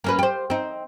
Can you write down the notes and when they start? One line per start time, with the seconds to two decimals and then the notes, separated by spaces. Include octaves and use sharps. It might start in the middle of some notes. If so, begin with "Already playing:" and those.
0.04 A#3 C#4 B4
0.19 G4 C5
0.50 C4 D#4